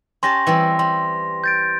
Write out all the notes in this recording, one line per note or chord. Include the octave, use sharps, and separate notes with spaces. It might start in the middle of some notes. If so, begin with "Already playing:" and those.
C#4 G4 A5 C6 A#6
E3 G3 C4
G3 C6
G6 A6 D7